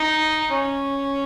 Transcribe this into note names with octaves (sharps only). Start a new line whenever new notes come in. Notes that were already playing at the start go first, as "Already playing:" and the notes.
Already playing: D#4
C#4